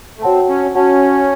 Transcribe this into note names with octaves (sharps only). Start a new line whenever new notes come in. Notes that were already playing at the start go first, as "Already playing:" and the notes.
A3
C4 F#4 C#5 F#5 A5
C#4
C#4 F#4 C#5 F#5 A5